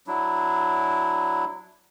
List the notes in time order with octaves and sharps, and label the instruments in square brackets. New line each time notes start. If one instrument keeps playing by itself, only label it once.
[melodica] F#3 D4 E4